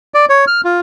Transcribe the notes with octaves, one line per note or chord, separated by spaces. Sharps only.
D5
C#5
F6
F4